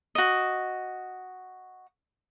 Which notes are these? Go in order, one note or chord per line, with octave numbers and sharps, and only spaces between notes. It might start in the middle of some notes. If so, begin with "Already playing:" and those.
F#4 D#5